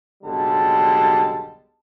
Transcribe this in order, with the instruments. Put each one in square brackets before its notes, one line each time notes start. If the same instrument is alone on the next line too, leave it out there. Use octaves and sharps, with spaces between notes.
[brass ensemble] F#1 B1 D3 G3 G#3 A5